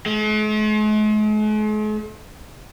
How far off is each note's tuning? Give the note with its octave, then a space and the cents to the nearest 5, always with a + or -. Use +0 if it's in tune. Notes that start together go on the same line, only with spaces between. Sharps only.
G#3 +45